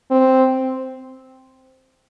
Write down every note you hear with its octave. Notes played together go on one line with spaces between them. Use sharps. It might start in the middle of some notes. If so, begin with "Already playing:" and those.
C4